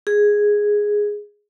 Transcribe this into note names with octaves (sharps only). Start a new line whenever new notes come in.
G#4